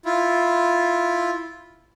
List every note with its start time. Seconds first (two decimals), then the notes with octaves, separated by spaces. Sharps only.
0.05 E4 F4